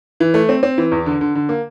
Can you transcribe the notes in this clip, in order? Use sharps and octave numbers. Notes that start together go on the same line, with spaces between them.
E3
A3
C4
C4
E3
E2
D3
D3
D3
A#3